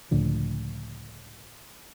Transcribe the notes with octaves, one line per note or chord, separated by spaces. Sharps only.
C#2 A2 D3 F3